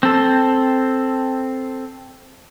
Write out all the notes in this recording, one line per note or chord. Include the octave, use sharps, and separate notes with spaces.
C4 A4